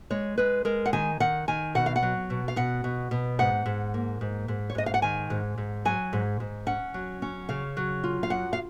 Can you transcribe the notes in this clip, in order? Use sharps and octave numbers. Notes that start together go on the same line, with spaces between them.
G#3 C#5
G#3 B4
G#3 A#4
F#5
D#3 G#5
D#3 F#5
D#3 G#5
B2 F#5
F5
F#5
F#3
B2
F5
B2 F#5
B2
B2
G#2 F#5
G#2
A#3
G#2
G#2
C#5
G#2 D#5
F5
F#5
D#3 G#5
G#2
G#2
F#3 G#5
G#2
G#2
C#4 F#5
F#3
C#4
C#3 F5
F#3
F4
F5
F#2 F#5
F5